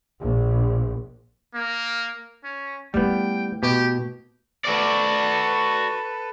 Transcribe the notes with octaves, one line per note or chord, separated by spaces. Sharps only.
A#1
A#3
C#4
G3 A3 B3 E4 G5
B2 G4
F#4 A4 B4 D5